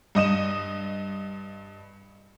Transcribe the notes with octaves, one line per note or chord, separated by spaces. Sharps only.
G2 D#5 D#6 E7